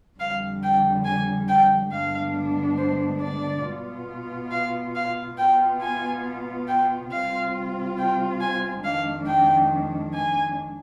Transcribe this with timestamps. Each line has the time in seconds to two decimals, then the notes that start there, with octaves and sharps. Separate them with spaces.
0.19 F2 D3 G3 F5
0.63 G5
1.05 G#5
1.48 G5
1.91 G2 D3 G#3 B3 D4 F5
2.78 C5
3.21 D5
3.64 B2 B3 F4
4.51 F5
4.95 F5
5.38 B2 B3 F4 G5
5.80 G#5
6.68 G5
7.11 C3 G3 C4 F4 F5
7.98 G5
8.40 G#5
8.83 F2 D#3 G#3 D4 F5
9.27 G5
10.13 G#5